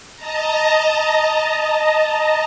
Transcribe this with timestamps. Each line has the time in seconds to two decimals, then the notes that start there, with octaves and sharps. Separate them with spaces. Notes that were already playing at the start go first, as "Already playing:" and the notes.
0.17 D#5 A5 A#5